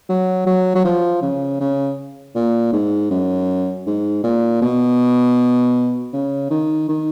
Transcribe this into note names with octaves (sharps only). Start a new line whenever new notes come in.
F#3
F#3
F#3
F3
C#3
C#3
A#2
G#2
F#2
G#2
A#2
B2
C#3
D#3
D#3